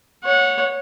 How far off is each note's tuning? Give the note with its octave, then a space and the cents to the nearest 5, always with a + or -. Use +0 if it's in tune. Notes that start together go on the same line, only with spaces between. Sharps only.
C#5 +0 F#5 -20